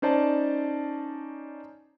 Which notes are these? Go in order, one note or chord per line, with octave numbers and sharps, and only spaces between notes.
C#4 D#4 C5 D5 A5